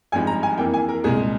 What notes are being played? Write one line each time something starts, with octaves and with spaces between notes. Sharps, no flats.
G#1 G2 F3 G#3 G#5
A#5
G#5
F2 E3 A#3 G5
G#5
A#4
C2 A#2 G#3 G#4